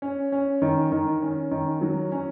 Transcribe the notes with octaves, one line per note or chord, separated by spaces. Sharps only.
C#4
C#4
D#3
D#3
C#4
D#3
F#3
C#4